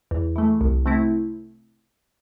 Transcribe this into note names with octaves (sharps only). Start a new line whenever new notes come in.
E2
E3 A3
C2
C3 A3 C4 E4